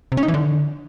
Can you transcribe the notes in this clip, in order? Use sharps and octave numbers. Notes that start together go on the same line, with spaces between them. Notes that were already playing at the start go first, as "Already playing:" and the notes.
C3
C#4
D#4
E3
D3